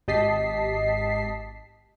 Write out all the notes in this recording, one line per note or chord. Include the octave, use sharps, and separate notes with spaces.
G#1 G4 D#5 A5 B6 C7